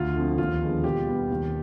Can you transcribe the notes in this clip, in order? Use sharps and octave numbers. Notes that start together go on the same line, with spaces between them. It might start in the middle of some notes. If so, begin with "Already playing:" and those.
Already playing: D2 F4
D3 F3 C4
D#2 F4
D3 F3 G#3 B3
B2 G4
G3 B3
D#2